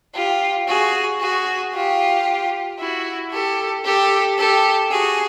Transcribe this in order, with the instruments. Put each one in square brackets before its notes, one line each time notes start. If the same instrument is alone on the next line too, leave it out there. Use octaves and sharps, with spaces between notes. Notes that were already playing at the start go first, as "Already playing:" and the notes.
[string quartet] F4 G4
F#4 G#4
F#4 G#4
F4 G4
E4 F#4
G4 A4
G4 A4
G4 A4
F#4 G#4